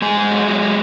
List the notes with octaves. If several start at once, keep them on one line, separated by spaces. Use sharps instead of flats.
G#2 G#3 G#4
G#2
F#3
F#3
F#3